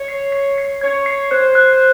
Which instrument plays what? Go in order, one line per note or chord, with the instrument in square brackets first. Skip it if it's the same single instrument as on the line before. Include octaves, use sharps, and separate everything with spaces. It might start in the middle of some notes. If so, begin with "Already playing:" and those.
Already playing: [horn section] C#5
[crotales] C7
C7
C7
[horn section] C#5 [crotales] G#6
[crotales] C7
[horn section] C5 [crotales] F#6
[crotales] F#6